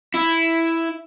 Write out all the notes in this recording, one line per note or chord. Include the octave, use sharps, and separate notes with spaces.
E4